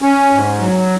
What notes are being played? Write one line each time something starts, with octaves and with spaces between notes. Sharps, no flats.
C#4
G#2
F#3